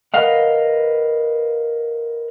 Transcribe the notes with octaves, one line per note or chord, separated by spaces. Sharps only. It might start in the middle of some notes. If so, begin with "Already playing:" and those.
A#4 B4 D#5 F5 F#5